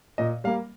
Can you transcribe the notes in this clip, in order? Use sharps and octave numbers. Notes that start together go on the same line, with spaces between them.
A#2 D#5
G3 A#3 F5